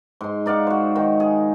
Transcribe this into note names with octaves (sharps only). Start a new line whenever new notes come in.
G#2 C6
D#4 D5 F5 F#5
F#4 C5
D#3
G#4